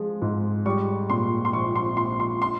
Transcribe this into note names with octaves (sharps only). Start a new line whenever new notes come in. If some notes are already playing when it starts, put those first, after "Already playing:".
Already playing: F3 G#3
G#2
G3 C#6
A#2 C6
C6
A#1 C#6
C6
A#1 C6
C6
C6